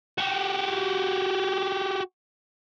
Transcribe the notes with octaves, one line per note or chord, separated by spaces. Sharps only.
F#4 G4